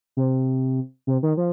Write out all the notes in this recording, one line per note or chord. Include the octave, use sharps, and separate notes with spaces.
C3
C3
D#3
F3